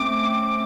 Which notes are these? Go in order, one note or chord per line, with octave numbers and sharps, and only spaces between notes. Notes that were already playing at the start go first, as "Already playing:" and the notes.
Already playing: A3 C4 C#4 D6